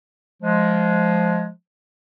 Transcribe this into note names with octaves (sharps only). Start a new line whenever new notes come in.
F3 G#3